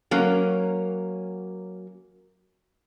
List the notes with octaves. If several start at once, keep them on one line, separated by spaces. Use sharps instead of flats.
F#3 A#3 C#4 A#4